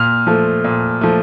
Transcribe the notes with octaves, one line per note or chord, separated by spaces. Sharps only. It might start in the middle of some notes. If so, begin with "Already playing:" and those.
Already playing: A#2 F6
F3 A3
A#2
F3 A3